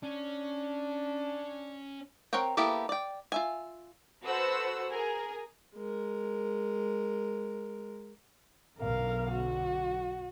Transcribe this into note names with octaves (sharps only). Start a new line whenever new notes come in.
C#4 D4
C4 A#4 C#5 F#5 G5
A#3 B3 E4 G4 A4
D5 G5
F4 E5 G#5
F#4 A4 B4 C5 F#5 E6
G#4 A#4 G#5 A#5
G#3 A#4
B1 F#2 D3 A#4 F5
F#4